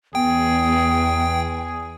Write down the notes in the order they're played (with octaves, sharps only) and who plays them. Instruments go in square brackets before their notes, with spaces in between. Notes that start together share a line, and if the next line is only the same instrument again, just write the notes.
[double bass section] E2 [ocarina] B3 [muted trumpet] G#4 [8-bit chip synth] G5